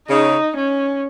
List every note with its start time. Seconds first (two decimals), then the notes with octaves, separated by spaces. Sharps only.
0.09 C#3 D#4
0.56 C#4